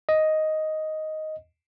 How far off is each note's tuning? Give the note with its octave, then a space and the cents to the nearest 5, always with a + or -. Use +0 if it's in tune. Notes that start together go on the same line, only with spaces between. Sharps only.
D#5 +5